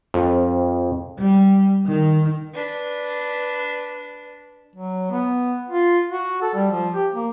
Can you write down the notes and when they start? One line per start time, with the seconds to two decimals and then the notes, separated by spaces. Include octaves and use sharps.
0.14 F2
1.19 G3
1.86 D#3
2.54 D4 B4
4.75 F#3
5.11 B3
5.69 F4
6.09 F#4
6.42 A4
6.54 G3
6.71 F3
6.94 G4
7.14 A#3